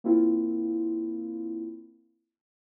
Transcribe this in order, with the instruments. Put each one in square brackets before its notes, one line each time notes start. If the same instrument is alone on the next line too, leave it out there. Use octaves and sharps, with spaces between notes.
[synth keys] A#3 C4 E4 F4